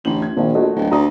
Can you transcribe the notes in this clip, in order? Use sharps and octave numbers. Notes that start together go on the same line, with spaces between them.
A1 D2 F#7
G#6
A#1 A#2 D#3 F3
A3 F#4 D#5
D1
D2 A#5 D#6